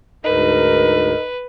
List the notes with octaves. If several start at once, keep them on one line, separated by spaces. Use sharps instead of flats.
D2 G#2 D#4 A#4 B4